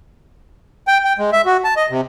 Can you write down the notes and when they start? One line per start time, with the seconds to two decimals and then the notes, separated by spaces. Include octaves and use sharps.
0.88 G5
1.05 G5
1.18 G#3
1.33 E5
1.46 F#4
1.64 A5
1.76 D#5
1.90 C3